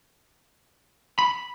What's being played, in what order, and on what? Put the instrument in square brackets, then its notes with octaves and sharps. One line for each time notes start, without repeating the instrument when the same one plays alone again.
[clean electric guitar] B5